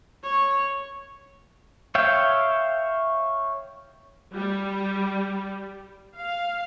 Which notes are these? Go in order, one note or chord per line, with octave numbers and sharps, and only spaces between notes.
C#5 C#6
C#5 E5 F5 G5
G3
F5